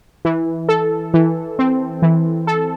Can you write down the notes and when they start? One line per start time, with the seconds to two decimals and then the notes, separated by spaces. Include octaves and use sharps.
0.25 E3
0.69 A4
1.14 E3
1.59 C4
2.02 E3
2.47 A4